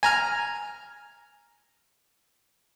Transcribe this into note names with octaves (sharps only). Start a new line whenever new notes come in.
G#5 A#5 F6